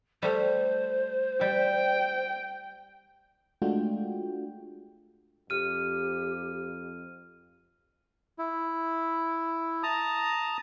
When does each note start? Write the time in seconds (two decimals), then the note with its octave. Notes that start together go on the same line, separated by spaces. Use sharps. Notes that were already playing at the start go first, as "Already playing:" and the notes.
0.22 G3 A3 C5
1.41 G3 G5
3.62 G#3 A3 D4 F4 F#4 G5
5.50 F2 G4 F6 D#7
8.39 E4
9.83 A5 A#5 D#6